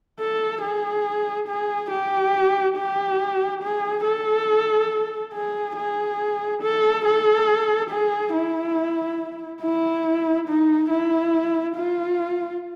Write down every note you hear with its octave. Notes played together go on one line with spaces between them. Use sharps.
A4
G#4
G#4
G4
G4
G#4
A4
G#4
G#4
A4
A4
G#4
E4
E4
D#4
E4
F4